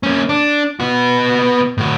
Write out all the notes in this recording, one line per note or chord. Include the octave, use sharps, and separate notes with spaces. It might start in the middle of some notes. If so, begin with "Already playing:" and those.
A#3 C#4
D4
B3 F#4
A2 F#4